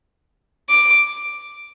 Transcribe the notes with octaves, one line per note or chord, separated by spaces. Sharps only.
D6